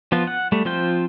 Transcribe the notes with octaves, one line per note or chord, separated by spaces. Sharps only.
F3 B3 F4
F#5
G3 A3
F3 C4 F4 C5 G5